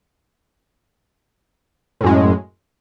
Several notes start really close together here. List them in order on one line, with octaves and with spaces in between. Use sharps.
A2 F#2 G#3